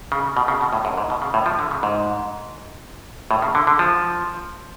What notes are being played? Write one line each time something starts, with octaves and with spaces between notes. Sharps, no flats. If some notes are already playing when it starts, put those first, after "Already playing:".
C#3
B2
C#3
B2
A2
F#2
G#2
B2
C#3
A2
F3
D3
C#3
G#2
A2
C#3
D3
D3
F3